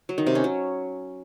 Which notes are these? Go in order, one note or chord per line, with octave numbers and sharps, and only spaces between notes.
F#3
D#3
C3
C#4
F#3